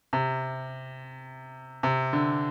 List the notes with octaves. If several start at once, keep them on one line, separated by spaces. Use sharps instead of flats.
C3
C3
D3